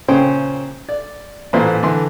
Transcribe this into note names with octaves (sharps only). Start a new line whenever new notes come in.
A#2 C#3 C#4 C5 G5
D5
A1 A#2 E3 B4 C5
D3 E3 C6